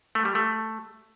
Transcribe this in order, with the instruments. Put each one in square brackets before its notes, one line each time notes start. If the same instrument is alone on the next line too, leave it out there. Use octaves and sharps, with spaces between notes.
[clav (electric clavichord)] A3
G3
A3